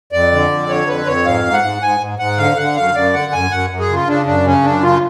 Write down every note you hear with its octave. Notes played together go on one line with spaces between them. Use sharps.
F2 D5
D3
F2
D3 C#5
F2 B4
F2 C#5
G#2 F5
G#2
F#5
G#2
G#2 G#5
G#2
G#2 F#5
D3 F5
D3 F#5
F#2 F5
F#2 D5
D3 F#5
F#2 G#5
F#2 F#5
F#2
G#4
C#3 F4
C#3 D4
F#2 D4
C#3 C#4
F#2 D4
C#3 F4